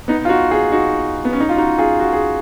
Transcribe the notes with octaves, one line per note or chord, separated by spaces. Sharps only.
B3 D#4
F4
D#4 F#4
F4 G#4
D#4 F#4
B3
C#4
D#4
F4
D#4 F#4
F4 G#4
F#4
G#4